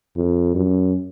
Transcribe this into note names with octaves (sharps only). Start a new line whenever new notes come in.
F2
F#2